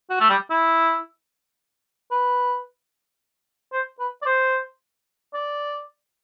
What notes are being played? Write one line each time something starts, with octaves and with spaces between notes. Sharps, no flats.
F#4
A3
G3
E4
B4
C5
B4
D5
C5
D5